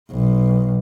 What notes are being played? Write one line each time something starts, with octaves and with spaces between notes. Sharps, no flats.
B1